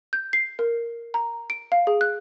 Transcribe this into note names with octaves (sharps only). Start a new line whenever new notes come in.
G6
C7
A#4
A#5
D7
F5
G#4
F#6